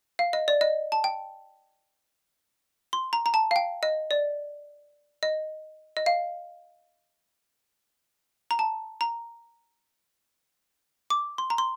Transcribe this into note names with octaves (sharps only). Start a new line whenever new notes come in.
F5
D#5
D5
D#5
A5
G5
C6
A#5
A#5
A5
F5
G5
D#5
D5
D#5
D#5
F5
A#5
A5
A#5
D6
C6
A#5
C6